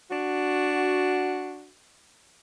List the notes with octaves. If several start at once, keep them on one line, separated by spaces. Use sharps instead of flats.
D4 F#4